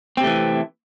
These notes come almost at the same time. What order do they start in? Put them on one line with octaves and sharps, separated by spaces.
C4 C3 A3 E3